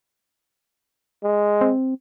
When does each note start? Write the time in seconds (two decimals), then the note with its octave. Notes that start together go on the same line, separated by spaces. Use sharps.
1.23 G#3
1.61 C4